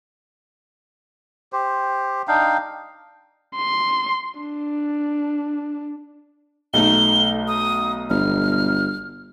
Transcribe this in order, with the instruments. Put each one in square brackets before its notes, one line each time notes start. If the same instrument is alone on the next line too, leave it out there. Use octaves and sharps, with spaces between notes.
[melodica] G4 C5
D4 D#4 F5 G5
[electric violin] C6
D4
[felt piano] B1 A3 D#4 [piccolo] G7
[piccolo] D#6
[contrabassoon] G1 [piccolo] F6